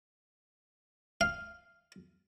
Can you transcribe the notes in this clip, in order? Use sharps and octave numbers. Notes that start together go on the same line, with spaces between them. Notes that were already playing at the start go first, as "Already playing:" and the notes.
F5